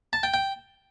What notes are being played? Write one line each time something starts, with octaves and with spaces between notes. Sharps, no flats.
A5
G5
G5